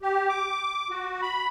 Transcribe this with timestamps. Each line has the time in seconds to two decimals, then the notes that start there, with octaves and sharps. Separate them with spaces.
0.02 G4
0.29 D6
0.90 F#4
1.22 B5